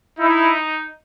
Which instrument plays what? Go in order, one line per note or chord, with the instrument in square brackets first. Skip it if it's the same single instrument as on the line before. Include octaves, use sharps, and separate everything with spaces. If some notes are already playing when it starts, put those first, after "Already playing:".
[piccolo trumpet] D#4 [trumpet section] E4